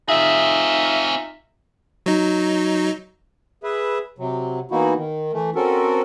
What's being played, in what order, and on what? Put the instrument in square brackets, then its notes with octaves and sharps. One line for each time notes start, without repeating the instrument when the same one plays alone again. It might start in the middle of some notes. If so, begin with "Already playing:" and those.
[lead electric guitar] C4 G#4 [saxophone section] D#4 F4 E5
[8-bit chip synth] F#3 D#4
[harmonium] G#4 B4 E5
C3 F#3
E3 A#3 B3 D#4 E4 F#4
D#3
E3 A3
C4 C#4 F#4 A4 A#4